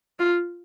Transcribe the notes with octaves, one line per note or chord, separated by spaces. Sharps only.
F4